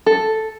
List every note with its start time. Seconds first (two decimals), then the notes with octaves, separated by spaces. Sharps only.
0.06 A4